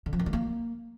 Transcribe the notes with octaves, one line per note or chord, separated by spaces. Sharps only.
D3
F3
D#3
G3
A#3